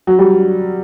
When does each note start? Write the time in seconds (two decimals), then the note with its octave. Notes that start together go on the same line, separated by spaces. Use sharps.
0.07 F#3
0.19 G3